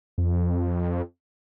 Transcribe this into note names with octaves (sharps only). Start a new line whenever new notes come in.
F2